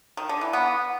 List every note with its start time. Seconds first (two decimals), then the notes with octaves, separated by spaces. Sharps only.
0.17 D#3
0.29 D3
0.41 E3
0.53 B3